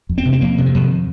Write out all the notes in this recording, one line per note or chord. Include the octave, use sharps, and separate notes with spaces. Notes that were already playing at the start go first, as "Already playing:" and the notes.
F2
C4
C3
C4
F2 A#3
C3
D#3
F2